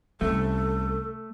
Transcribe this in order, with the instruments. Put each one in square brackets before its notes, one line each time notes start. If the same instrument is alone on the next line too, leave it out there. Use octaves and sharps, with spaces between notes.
[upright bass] C2 C#4 [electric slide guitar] A3 [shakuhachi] A4